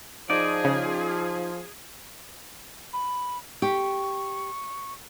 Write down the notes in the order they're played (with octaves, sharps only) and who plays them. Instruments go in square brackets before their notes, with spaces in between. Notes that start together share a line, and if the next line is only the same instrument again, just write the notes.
[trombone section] F3 [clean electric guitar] D#4 D5 [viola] G#4
[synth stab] C#3
[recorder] B5
[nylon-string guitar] G4 [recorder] C#6